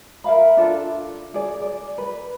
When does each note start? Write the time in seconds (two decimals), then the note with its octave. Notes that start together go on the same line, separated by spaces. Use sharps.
0.24 A#4 E5 F5 B5
0.57 D4 F4 A4
1.34 G#4 D5
1.62 D5
1.98 B4